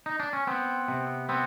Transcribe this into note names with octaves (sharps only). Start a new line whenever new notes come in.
D#4
D4
C#4
B3 C4
C3
B3 C4